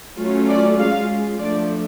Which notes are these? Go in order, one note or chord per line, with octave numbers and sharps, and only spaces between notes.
F#3 A3 C#4 F4
D5
G#3 C#4 F4 F5
F3 A3 D4 D5